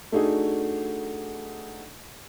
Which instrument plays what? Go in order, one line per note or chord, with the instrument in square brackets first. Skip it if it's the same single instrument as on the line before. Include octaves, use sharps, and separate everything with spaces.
[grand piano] A3 D4 D#4 F#4 G#4